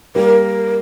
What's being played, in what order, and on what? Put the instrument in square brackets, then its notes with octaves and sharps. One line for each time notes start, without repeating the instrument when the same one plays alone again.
[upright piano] G3 A#3 [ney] A#4